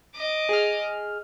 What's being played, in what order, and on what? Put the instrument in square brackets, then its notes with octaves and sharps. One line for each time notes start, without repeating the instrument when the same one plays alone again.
[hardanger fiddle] D#5 D6
[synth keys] G#4 F6